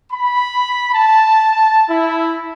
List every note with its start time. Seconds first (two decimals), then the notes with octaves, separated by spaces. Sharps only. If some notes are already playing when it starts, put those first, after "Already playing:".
0.13 B5
0.94 A5
1.89 E4